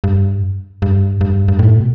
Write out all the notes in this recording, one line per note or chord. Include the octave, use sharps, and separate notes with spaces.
G2
G2
G2
G2
A2
B2